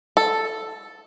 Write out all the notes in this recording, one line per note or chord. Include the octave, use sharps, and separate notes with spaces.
A4